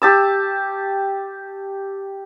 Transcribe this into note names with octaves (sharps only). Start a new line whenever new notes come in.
G4 A5 E6